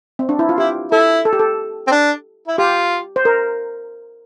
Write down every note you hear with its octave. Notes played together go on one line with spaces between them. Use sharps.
C4
D4
E4
F4
E4 G4
E4 A4
A4
G4
A4
C4
D4
E4
F4 G4
C5
A#4